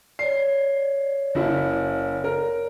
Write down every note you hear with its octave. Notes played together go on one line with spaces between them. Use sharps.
C#5 D5 C7
F#1 E4
A#4